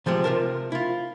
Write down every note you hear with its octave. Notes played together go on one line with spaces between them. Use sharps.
C3 F3 G3 G#3
C3 F4 A#4 A5
E4 F4